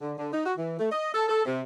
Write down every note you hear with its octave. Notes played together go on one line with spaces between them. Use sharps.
D3
D3
D#4
F#4
E3
A3
D#5
A4
A4
C3